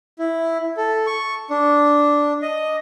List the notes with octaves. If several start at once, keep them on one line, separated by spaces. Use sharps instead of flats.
E4
A4
C#6
D4
D#5